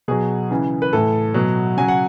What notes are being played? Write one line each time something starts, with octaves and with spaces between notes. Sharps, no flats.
B2 F#3 G#4
C#3 E3
B4
A2 E3 A4
B2 F#3
C#3 F#3 G#5
F#5